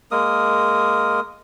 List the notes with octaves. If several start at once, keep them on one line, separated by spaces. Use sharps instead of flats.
G#3 A#3 A#4 D#6